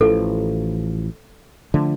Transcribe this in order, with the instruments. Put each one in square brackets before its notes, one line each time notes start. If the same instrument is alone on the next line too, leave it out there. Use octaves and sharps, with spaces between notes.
[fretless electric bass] A1 E3 F3 [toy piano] A4
[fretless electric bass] D3 F3 A3